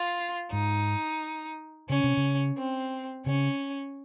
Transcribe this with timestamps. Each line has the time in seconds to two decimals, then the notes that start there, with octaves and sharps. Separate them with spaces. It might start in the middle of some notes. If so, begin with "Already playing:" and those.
Already playing: F4
0.52 G#2 D#4
1.89 C#3 C#4
2.04 C3
2.17 C#3
2.58 C4
3.26 C#3 C#4